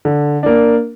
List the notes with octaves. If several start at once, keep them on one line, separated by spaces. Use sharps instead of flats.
D3
A#3 D4